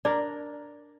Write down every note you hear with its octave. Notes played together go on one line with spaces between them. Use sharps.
D4 A#4 D5